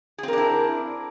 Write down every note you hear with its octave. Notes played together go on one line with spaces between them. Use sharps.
C4 D4 E4 G#4 A#4